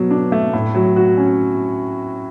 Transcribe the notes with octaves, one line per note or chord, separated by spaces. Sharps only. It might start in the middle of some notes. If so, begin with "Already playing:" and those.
Already playing: B2 F#3
D4
A3
A2
F#3
F#4
C#4